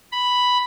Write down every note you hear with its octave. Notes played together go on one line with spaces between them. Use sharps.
B5